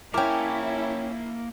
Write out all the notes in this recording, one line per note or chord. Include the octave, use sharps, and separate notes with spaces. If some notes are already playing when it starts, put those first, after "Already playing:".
A#3 C#4 E4 A#4 G5 A5 D6